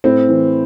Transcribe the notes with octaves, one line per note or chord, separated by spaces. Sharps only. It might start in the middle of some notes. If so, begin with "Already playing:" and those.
A2 C4
E3